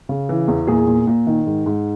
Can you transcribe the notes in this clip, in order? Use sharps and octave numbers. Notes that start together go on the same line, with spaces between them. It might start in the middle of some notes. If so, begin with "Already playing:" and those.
C#3
E3
E2
A#2 G#4
A#2
A#2
D#3
G#2
G#2